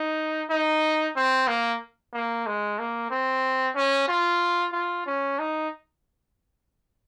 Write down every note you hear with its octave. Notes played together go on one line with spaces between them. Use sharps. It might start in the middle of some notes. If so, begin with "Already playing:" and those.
Already playing: D#4
D#4
C4
A#3
A#3
G#3
A#3
C4
C#4
F4
F4
C#4
D#4